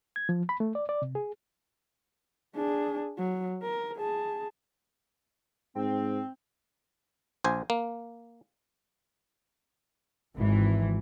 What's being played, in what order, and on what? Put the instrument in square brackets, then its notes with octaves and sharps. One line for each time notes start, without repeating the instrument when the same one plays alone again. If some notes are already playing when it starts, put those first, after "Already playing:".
[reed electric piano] G#6
F3
B5
A3
D5
D5
C3
G#4
[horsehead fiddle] D4 G#4
F#3
A#4
G#4 A5
[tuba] G#2 [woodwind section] C4
[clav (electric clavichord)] A#1 C5 G#5
A#3
[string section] G#1 E3